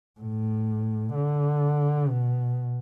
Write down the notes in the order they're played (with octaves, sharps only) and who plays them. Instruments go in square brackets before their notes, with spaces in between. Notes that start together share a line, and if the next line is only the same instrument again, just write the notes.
[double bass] A2
D3
B2